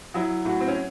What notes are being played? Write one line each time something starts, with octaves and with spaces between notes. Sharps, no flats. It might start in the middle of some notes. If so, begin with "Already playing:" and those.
F#3 E4
A2 F#4
C4
C#4